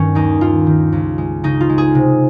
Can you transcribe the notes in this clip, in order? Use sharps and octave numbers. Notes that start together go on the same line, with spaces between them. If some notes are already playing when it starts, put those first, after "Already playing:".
Already playing: G2 D#3 C#4
D#2 D#4
D#2 F4
D#3
C#2
G#3
C#3 D#4
F4
G#3
G#4
C3